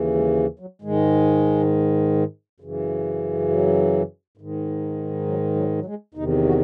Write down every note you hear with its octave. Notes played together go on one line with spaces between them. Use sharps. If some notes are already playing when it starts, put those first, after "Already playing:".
Already playing: D#2 C#3 E3
G#3
F#3
G#2 D#3 G#3
F#2 C#3 E3
F#3
G#2 D#3
F#3
F#3
F#3
G#3
E2 C3 D#3 D#4
F#4